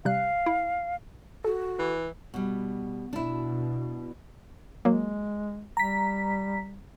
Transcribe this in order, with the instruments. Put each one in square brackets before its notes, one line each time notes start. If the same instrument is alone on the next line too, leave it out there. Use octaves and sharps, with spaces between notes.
[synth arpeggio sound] C3 G3 F#6 [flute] F5
[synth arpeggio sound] E4
[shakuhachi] F#4 [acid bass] A4
[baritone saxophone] E3
[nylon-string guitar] B2 G3
[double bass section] B2 [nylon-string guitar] D4 E4
[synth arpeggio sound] F#3 A#3 [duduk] G#3
[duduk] G3 [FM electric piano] A#5 B6